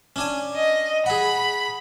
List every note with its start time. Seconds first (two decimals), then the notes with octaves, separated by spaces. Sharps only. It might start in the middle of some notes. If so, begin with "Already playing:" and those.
0.16 C#4 D4 G#5
0.55 D#5
1.06 G#4 F#5 B5